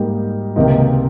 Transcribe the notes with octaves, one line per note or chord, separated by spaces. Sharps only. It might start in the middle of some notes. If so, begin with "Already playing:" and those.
Already playing: G#2 G3 A#3 D#4
C#2 C3 D#3 A#3 D#4